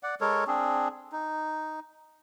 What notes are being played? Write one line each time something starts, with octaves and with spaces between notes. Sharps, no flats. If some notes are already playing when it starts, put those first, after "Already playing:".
D5 F#5
G#3 A4 A#4 C#5
C4 D4 G#4
D#4